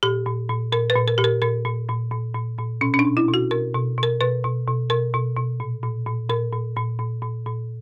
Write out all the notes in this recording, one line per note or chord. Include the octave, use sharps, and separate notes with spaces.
A#2 G4
A#2
A#2
A#2 A#4
B4
A#2
A#4
A#2 G4
A#4
A#2 A#4
A#2
A#2
A#2
A#2
A#2
B2 C#4
C#4
D4
B2
E4
B2
F#4
B2 A#4
B2
B2
A#4
B2 B4
B2
B2
B2 A#4
B2
B2
A#2
A#2
A#2
A#2 A#4
A#2
A#2
A#2
A#2
A#2